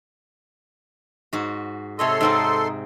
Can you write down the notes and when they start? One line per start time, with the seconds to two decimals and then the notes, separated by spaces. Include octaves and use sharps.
1.33 G#2 F#4
1.99 C3 A4 C#5 D#5 C6
2.21 G#2 C4 D#4